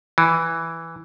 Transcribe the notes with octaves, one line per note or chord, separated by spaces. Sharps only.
E3